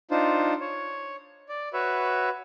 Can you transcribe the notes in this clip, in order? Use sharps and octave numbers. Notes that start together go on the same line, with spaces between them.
D4 D#4 F4 C5
C#5
D5
F#4 B4 C#5 E5